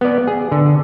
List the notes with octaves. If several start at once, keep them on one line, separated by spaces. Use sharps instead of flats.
B3 D5
G#4
D3